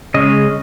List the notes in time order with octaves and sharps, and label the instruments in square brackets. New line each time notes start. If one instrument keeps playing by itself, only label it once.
[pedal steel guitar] C#3 G#3 C#4 D#5